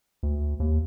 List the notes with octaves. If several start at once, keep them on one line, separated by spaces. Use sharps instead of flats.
D2
D#2